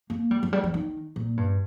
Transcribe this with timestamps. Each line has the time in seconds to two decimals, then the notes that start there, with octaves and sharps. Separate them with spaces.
0.10 A#3
0.31 G3
0.43 F3
0.53 G3
0.64 F3
0.74 D#3
1.16 A#2
1.37 G2